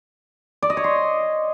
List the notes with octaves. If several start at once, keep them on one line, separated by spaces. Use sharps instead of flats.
D5
D#5
C#5
C6